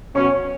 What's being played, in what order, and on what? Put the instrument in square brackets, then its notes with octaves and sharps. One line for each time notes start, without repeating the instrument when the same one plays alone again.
[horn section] B2 F#3 C#4 [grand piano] C#5 C#6